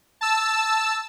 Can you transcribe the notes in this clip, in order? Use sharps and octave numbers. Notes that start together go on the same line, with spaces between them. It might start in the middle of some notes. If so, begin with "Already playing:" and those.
A5 E6